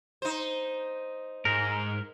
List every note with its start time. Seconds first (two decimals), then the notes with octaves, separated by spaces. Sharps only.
0.22 D#4 C5
1.45 G#2 A#4